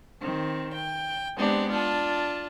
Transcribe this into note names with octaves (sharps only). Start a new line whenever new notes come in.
D#3 C4
G5
G#3 B3 C4 D4 G4
D4 F4 A5